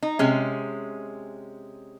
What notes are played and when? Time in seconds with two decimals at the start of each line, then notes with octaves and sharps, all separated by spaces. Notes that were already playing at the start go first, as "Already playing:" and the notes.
0.03 D#4
0.19 C3 G#3 C#4